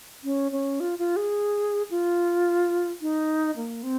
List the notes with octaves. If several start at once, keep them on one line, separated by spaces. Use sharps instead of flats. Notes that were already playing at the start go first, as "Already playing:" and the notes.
C#4
C#4
F4
F4
G#4
F4
D#4
A#3
C4